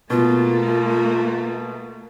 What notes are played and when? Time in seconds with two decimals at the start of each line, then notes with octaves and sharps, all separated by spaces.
0.10 B2 A3 A#3 F4